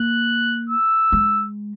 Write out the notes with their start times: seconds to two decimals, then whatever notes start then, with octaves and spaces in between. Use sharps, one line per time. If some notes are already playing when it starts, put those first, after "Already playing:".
Already playing: A#3 F#6
0.69 E6
1.12 G#3